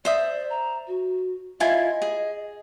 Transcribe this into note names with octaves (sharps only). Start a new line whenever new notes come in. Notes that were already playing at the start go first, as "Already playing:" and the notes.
C5 D5 E5 D#6
A#5
F#4
E4 F4 D#5 G#5
G#4